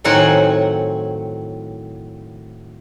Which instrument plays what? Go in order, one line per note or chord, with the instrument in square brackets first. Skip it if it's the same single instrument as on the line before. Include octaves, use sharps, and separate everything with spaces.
[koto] A2 D#3 F#3 C4 F#5 G#5